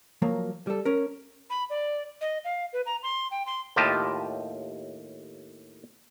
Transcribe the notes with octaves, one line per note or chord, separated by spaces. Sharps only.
F3 F#3 A#3
G3 A4
C#4 A#4
B5
D5
D#5
F5
B4
A#5
C6
G5
C6
D#2 A2 F4 G4 D#5 A5